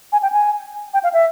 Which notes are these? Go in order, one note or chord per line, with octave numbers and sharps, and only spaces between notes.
G#5
G5
G#5
G5
F5
E5